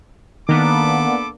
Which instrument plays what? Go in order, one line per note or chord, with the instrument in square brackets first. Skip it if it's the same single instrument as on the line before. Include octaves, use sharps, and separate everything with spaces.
[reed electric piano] D#3 [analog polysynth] A#3 B3 D4 [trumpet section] A4 B5 D6